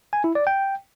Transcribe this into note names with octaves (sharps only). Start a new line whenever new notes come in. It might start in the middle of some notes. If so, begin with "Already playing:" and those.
G#5
E4
D5
G5